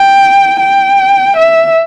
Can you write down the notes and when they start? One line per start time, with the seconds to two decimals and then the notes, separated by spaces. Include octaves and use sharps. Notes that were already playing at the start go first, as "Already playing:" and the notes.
Already playing: G5
0.60 G5
1.37 E5